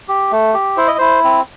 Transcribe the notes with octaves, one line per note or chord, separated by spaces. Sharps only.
G4
A3
G4
E4 C5
D#5
E4 C5
C4